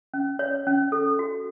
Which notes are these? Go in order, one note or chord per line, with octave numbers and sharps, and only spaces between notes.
C#4
C#5
C#4
A4
F#4